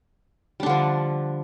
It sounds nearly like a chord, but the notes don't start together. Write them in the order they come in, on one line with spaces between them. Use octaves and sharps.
G3 D4 D3 F3